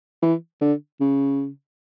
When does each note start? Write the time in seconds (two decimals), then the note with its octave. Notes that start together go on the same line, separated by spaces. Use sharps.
0.23 E3
0.61 D3
1.01 C#3